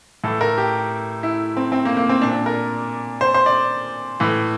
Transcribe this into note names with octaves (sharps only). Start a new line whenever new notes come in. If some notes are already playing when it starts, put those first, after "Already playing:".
A2 E3 A4
A#4
G4
E4
C4
C4
A#3
A#3
C4
A#2 D4
A#4
C5
C5
D5
A2 E3